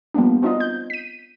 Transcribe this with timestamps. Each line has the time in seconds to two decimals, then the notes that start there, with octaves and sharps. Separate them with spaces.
0.14 F3 G3 A#3 B3 D4
0.42 B3 C4 D4 D#4 F4 D#5
0.60 G6
0.90 B6 D#7